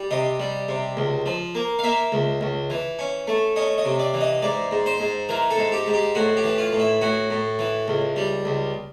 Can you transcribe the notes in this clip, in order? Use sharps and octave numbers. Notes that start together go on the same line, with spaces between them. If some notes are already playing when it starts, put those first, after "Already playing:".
Already playing: G3
C3 D#5
G3
C3
C#2
F3
A#3
F5
A#3 E5
C#2
C#2
E3
C#4
A3
C#4 D#5
D#5
C3
D5
E3
D#5
G#2 D5
G#2
C5
G#2
E3 A#4
A4
G#2
G4
G#2
G4
A2 F#4
G4
E3
F4
A2
E4
A2 F#4
A2
E3
C#2
G3
C#2